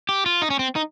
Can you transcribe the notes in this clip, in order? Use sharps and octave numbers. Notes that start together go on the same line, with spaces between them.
G4
F4
D#4
C#4
C4
D#4